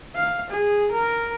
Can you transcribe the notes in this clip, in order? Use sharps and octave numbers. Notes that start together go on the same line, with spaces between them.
F5
G#4
A#4